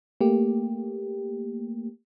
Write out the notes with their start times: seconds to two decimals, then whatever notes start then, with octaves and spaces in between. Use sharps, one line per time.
0.21 A3 A#3 G4